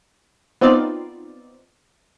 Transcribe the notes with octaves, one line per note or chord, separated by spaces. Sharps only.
B3 C4 D#4 F4 D5